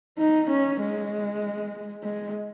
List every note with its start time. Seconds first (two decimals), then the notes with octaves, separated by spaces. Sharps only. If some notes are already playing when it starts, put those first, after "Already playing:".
0.19 D#4
0.50 C#4
0.80 G#3
2.03 G#3